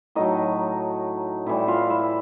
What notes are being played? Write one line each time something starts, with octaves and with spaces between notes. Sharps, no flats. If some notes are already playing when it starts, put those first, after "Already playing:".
A2 F#3 A3 D#4 D#5
A2 E3 G3 E4 E5
F4 F5
E4 E5